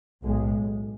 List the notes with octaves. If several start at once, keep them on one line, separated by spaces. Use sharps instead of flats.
B1 A2 G#3